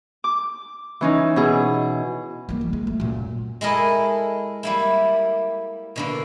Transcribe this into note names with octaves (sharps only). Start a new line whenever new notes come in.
D6
E3 C#4 D#4
B2 E4 G#4
G3 A#3
E2
G#3
A3
F#2 A#2
G#3 E4 A4 A#4 D#5
G3 A#3 E4
B2 D3 A#3